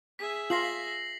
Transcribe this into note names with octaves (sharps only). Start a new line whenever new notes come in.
G#4 E5 B6
F4 A#6 C7 F#7